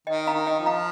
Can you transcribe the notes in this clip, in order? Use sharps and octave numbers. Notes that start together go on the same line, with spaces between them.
D#3 D#5 G5
F5 A#5
D#3
D#5 G5
F3
F5 A#5